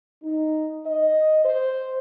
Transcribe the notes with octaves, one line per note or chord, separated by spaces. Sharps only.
D#4
D#5
C5